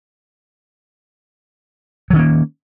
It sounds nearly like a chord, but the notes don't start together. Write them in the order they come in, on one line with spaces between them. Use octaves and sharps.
F#3 D#3 C#4 A#3